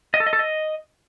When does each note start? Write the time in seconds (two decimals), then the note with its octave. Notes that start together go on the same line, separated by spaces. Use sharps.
0.14 D#5
0.20 A4
0.27 D#5
0.33 A4
0.39 D#5